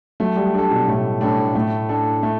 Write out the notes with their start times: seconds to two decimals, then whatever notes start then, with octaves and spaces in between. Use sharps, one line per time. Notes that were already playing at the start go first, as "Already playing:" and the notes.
0.20 F#3 A3
0.36 G3
0.54 D4 A4
0.71 B2
0.87 A2 A3
1.21 A2 D4 A4
1.55 A2 A3
1.89 D4 A4
2.23 A3